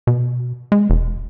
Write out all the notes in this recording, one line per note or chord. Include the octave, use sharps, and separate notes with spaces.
B2
G#3
E1